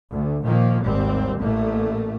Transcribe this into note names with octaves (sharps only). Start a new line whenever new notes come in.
D2
A#2 D#3 F3 A#3
G#1 D#2 G3 C4
A1 A2 A3 A#3